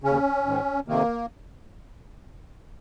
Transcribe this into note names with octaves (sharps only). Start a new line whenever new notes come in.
D#2 C#3 C#4
G#2 D#3
F2 C3 D#3 A#3